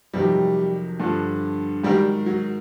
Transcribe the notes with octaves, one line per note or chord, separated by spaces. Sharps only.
F2 C3 D#3 F#3 G3
G2 D3 F3
G#2 D#3 F#3 G3
F#3